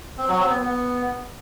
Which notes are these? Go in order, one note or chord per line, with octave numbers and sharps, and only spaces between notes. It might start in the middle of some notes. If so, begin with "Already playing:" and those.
C4
F#3
C4
B3
B3